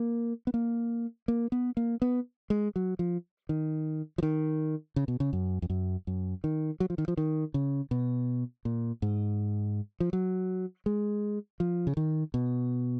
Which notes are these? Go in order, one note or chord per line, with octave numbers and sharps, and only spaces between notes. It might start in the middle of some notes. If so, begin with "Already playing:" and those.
Already playing: A#3
B3
A#3
A#3
B3
A#3
B3
G#3
F#3
F3
D#3
F3
D#3
C#3
B2
C#3
F#2
F2
F#2
F#2
D#3
F#3
F3
D#3
F3
D#3
C#3
B2
A#2
G#2
F3
F#3
G#3
F3
C#3
D#3
B2